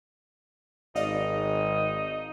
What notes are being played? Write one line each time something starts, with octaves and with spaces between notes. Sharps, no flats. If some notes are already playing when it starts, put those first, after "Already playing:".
G#1 D#4 D5 D#5 F5